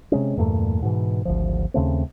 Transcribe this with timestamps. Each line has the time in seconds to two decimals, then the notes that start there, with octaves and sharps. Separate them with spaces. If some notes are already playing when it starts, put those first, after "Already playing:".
0.12 C3 G#3 C#4
0.37 E2 G2 A#2 A3
0.82 G#2 B2 E3
1.25 G#1 D2 F3
1.74 D#2 C#3 A3 C4